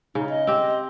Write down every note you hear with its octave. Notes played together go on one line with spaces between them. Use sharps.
C#3 D#4
D#5
C4 G4